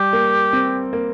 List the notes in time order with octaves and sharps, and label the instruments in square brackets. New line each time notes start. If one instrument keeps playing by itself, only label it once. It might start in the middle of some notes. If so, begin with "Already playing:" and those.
Already playing: [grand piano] G3 [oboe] G4
[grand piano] A#3
C4
A#3